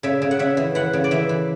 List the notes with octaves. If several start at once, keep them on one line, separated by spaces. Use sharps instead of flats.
C#3 E5
C#3
F#5
C#3 E5
E3
E3 F#5
C#3
D5
E3 E5
E3